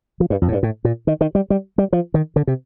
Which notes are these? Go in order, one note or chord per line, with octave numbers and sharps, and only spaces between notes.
F3
G2
F2
A2
G2
A2
A#2
D#3
D#3
G3
G3
G3
F3
D#3
D3
C3